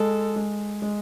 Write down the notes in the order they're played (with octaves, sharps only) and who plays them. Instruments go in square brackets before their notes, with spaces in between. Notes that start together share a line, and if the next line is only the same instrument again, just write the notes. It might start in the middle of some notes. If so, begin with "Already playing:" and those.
Already playing: [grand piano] G#3 [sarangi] A4
[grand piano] G#3
G#3